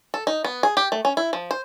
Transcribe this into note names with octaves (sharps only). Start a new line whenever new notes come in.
A4
D#4
B3
G#4
G4
A3
C#4
E4
F3
C5